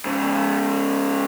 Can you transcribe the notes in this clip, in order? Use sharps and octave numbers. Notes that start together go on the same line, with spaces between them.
G#2 C#3